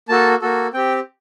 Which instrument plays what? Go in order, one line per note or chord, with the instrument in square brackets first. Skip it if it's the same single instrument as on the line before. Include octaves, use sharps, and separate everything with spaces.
[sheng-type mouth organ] A#3 F#4 A4 A5
A#3 F#4 A4
C4 G4 G5